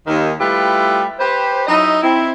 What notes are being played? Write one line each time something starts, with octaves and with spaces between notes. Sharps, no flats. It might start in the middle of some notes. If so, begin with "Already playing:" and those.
D#2 D#3
G3 A3 E4 F4 G4 B4
G4 B4 C5
F#3 D#4 E4 D#5
C4 E4